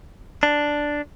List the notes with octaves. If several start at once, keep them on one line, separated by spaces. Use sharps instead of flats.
D4